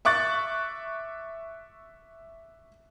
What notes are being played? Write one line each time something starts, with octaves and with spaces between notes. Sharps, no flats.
E5 C#6 D6 F#6 A6